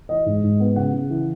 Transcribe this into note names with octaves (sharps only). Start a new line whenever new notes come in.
E3 D#5
G#2
G#2
B3
C#3 F#5
C#3
E3